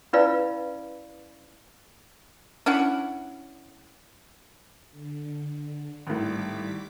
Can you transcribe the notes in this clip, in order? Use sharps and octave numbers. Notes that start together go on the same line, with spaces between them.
C#4 E4 B4 D5 F5 B5
C#4 D4 E4 F#5
D3
G#1 A2 G3 D6 B6